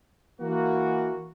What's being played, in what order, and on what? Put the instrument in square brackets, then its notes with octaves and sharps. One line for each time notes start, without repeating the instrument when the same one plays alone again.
[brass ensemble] E3 A#3 F#4